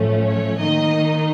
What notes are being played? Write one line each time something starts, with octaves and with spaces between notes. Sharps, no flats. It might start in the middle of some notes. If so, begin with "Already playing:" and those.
Already playing: A2 F3 A3 C#4
C#5
D#3 A#3 D#4 D#5